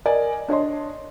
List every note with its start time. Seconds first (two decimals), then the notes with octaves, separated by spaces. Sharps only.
0.05 A#4 D5 D#5 G#5
0.48 D4 C#5 D#5 C6